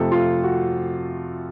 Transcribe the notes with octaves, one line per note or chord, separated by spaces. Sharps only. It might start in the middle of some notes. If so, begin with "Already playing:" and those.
Already playing: F2 C3 F3 A3 A4
F4
F#4